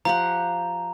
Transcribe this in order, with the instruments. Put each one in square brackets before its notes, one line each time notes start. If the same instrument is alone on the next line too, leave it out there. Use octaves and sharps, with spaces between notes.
[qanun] F3 G4 F#5 [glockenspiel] A#5